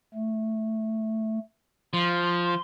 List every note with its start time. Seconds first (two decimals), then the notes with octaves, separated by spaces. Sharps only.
0.15 A3
1.93 F3 C6